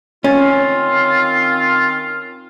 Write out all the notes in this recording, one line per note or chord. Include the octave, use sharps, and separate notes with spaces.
D#3 C4 C#4 F4